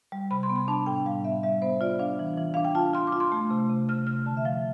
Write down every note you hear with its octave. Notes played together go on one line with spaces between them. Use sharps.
G3
C3 B5
C6
B3
B5
D4 A5
A2 G5
G3 F5
B3 E5
G3 E5
B3 C5
F4 D5
D4 F5
E3
E3
D4 F5
G5
F4 A5
F4 C6
D6
F4
C6
A3
C3
C3
C3 F6
C3 F6
D3 A5
E5
F3 F5